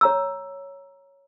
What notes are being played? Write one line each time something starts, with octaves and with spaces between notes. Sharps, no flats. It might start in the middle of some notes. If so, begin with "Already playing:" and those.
C#5 A#5 E6